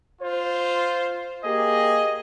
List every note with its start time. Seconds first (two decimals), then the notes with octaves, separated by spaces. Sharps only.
0.22 F4 C5
1.44 A#3 G4 G#4 D#5